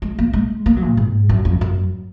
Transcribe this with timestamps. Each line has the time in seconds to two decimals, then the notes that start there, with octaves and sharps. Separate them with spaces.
0.02 G#3
0.19 A#3
0.33 G#3
0.66 A#3
0.77 F#3
0.87 A#2
0.97 G#2
1.29 F#2
1.45 F2
1.61 F#2